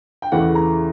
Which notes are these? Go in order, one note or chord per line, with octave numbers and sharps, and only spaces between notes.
G5
E2 C#3 E3 A3 F#5
A#5